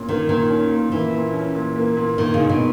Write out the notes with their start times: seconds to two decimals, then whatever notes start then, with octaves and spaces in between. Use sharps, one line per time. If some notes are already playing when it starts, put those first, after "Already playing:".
Already playing: A#2 C#4
0.09 D#3 A#3
0.29 A#2 D#3
0.50 C#4
0.72 A#2
0.92 E3 A#3
1.13 A#2
1.34 C#4
1.55 A#2
1.76 A#3
1.97 A#2
2.18 D#3 A#3
2.34 C#3
2.39 D#4
2.49 B2